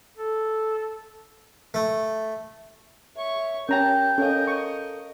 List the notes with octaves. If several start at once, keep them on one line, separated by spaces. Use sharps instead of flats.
A4
A3
C#5 E5 C#6
C#4 G4 A#4 G5 A5 A#5 G6
C#4 A4 A#4 D#5 F5
C#6